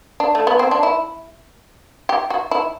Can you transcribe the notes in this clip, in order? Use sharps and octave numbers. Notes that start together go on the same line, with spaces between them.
D4
A3
B3
C4
D4
E4
G4
F#4
E4